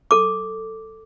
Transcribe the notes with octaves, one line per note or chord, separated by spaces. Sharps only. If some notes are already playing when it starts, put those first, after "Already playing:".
A4 D6